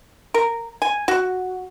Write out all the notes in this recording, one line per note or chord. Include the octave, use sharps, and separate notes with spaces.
A#4
G#5
F#4